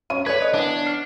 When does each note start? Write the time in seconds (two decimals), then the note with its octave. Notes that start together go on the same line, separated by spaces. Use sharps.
0.10 F#3 C#4 C#5 D#7
0.26 G#3 A3 B4 C#5 D5 G#6
0.42 D#5
0.54 E3 B3 D4
0.86 F6 C7